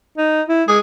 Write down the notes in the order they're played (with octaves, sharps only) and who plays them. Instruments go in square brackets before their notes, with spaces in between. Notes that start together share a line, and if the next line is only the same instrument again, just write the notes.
[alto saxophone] D#4
E4
[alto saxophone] G#3 [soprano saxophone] G#4